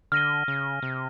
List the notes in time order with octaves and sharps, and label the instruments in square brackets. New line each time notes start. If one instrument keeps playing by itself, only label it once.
[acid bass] D3 [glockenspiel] F6 A#6 D#7 G7
[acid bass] C#3
C3